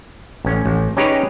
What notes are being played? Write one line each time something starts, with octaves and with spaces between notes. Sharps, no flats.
A1 C#4
A1
C#4 D#4 G4 G#4 B4 C#5